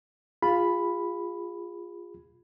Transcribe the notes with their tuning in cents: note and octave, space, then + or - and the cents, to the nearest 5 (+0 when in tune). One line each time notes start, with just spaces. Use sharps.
F4 +0 G#4 -25 B5 +0